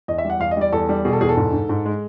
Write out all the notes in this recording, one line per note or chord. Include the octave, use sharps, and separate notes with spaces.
E2 D#5
E5
G3
F#5
E2 F5
D#5
G3 D5
E2 A4
G3
B2 G#4
A4
E2 G#4
A4
G#2
G#2
G#2
G#3